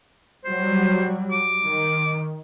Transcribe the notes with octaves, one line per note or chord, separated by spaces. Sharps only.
F#3 G3 C5
D6
D#3